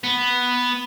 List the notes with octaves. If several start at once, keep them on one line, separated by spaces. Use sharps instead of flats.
B3